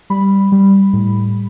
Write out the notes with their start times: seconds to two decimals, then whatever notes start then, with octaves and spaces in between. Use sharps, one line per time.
0.10 G3 B5
0.52 G3
0.93 A2